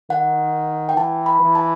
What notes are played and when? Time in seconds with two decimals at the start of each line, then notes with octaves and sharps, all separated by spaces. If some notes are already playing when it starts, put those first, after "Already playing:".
0.10 D#3 F#5
0.89 G5
0.97 E3 A5
1.26 B5
1.40 E3
1.55 A5